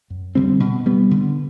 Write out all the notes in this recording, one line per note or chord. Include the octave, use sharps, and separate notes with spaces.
F#2
D3 G3 C4
B2
G3 B3
D3